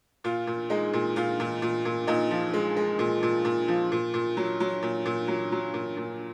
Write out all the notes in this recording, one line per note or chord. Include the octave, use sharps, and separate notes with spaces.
A#2 F4
A#2
G#3 D#4
A#2
A#2 F4
A#2
A#2
A#2
A#2 D#4
F3
G#3
G#3
A#2
A#2
A#2
F3
A#2
A#2
F#3
F#3
A#2
A#2
F#3
F#3
A#2
A#2